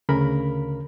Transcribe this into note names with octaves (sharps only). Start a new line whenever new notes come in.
D2 C#3 A#4 B5